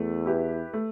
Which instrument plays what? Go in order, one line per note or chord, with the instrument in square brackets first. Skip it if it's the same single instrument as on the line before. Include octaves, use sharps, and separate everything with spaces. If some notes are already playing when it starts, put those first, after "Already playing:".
Already playing: [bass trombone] E2 [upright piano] A3
[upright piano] E4 G4 B4
A3